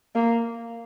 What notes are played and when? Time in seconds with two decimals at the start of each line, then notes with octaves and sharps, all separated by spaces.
0.15 A#3